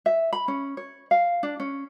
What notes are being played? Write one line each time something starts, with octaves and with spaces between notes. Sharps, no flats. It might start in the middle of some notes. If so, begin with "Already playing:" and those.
E5
B5
C#4
C#5
F5
D4
C#4